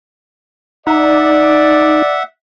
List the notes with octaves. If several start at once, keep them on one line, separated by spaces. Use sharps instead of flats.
D#4 D5 E5 F#5